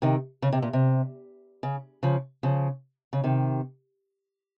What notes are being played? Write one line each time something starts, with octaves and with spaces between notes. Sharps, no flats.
C3 D#3
C#3
C3
A#2
C3
C#3
C#3 F3
C#3 F3
C#3
C3 D#3